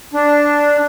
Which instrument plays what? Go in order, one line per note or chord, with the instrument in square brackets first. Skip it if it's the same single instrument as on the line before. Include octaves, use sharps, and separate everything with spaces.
[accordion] D4